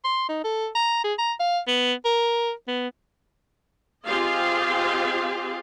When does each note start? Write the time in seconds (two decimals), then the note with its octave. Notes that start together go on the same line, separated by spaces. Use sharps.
0.04 C6
0.28 D#4
0.44 A4
0.75 A#5
1.04 G#4
1.18 A#5
1.40 F5
1.68 B3
2.05 A#4
2.67 B3
4.05 C4 F4 G4 G#4 D#5 F5